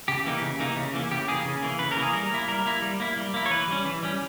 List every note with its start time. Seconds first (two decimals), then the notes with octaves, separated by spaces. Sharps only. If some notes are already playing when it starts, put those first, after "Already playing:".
0.08 C#3 G4
0.25 E3 A#3 D#4
0.42 C#3
0.59 E3 A#3 D#4
0.76 C#3
0.93 E3 A#3
1.11 C#3 G4
1.28 E3 A#3 G#4
1.45 C#3
1.62 E3 A#3
1.79 C#3 B4
1.91 A#4
1.97 E3 A#3
2.03 G#4
2.13 G3 A#4
2.31 A#3 E4
2.48 G3 A#4
2.66 A#3 E4
2.82 G3
3.00 A#3 E4
3.17 G3
3.34 A#3 E4
3.46 C#5
3.50 E3 B4
3.68 G3 C#4
3.85 E3
4.03 G3 C#4